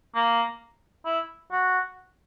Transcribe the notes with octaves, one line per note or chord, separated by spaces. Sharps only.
A#3
E4
F#4